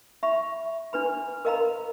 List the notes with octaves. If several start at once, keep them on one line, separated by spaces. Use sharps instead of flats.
E5 B5 C#6
D4 B4 B5
A#4 D#5 F5 A#5 B5